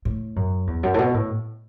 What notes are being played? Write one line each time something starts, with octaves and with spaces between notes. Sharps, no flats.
A2
F#2
E2
F#2
A2
B2
A2